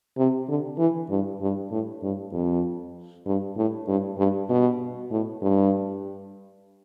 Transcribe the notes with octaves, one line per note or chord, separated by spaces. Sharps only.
C3
D3
E3
G2
G2
A2
G2
F2
G2
A2
G2
G2
B2
A2
G2